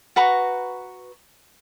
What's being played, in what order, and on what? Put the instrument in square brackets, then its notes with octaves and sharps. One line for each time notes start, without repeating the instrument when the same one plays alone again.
[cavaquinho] F#4 B4 A#5 C#6